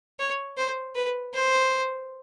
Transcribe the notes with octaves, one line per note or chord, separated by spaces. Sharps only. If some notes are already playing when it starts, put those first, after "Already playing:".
C#5
C5
B4
C5